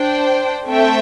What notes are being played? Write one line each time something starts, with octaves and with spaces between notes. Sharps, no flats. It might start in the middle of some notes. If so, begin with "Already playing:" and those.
Already playing: D4 C5 G5
A3 C4 A4 E5 G5